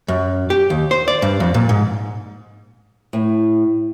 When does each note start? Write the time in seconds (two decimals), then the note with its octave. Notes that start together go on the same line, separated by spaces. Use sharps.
0.08 F#2
0.50 G4
0.70 D#2
0.91 C5
1.08 D5
1.22 G2
1.40 F2
1.54 A#2
1.69 G#2
3.13 A2